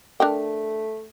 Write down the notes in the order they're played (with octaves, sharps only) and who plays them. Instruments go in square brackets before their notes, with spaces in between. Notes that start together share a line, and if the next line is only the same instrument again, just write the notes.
[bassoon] A3 [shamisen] D4 A#4 G5